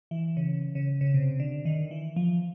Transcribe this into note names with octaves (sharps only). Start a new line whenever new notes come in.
E3
C#3
C#3
C#3
C3
D3
D#3
E3
F3